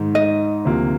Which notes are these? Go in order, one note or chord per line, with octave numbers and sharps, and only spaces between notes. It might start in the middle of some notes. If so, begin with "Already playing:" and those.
Already playing: G#2 D#3 G#3 D#4
D#5
D2 C3 F3 A#3